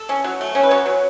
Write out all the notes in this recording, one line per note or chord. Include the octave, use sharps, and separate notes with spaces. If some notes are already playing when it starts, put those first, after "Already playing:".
Already playing: A4
C#4
F#3
A3
C#4
B4
F#3 C#5
F#3